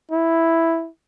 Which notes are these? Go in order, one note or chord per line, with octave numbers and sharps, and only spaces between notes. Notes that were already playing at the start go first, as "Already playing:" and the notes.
E4